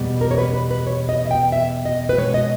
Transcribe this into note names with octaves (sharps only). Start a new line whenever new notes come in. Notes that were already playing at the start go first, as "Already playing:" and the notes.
Already playing: E2 B2 G3
A#4
C#5
B4
B4
B4
C#5
D#5
E5
G5
E5
D#5
B4
B2 G#3 C#5
D#5